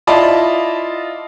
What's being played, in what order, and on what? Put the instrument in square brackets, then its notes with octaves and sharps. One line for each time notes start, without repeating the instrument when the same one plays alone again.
[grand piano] E4 F4 D5 D#5 A5 B5